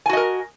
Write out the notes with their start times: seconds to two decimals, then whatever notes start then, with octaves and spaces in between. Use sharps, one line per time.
0.06 G#5
0.09 F#4
0.13 D#5
0.17 A#4